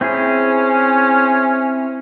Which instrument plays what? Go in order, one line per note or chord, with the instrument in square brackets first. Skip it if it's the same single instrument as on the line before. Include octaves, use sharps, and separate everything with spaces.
[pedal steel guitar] C4 E4 G#4 [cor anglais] C#4